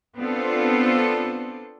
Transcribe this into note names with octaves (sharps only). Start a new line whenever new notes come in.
B3 C4 D4 F4 A4 C5